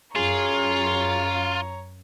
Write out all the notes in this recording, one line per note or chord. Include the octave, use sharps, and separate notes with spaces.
F#2 F4 G#4 C#5 A#5